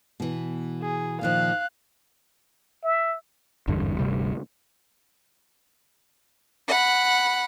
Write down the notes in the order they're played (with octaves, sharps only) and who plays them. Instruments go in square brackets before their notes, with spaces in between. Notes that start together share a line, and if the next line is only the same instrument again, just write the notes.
[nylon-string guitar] B2 E3
[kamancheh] G#4
[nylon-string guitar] A#2 D#3 F3 [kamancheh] F5 F#6
[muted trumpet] E5
[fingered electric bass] G#1 E2 G2 D3
G1 D2 C3 G3
[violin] F#5 B5